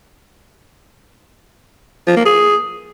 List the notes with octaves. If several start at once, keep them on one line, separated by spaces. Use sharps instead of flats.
F3
A#3
G#4